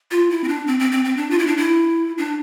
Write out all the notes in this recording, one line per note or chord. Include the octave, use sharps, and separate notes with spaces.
F4
E4
C4
D4
C4
C4
C4
C4
D4
F4
E4
D4
E4
D4